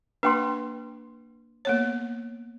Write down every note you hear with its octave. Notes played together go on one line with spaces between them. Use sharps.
A#3 D4 B4 G5 C6
A#3 B3 C#5